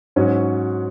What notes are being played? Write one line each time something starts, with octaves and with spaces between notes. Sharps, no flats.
G#2 F#3 C#4 F#4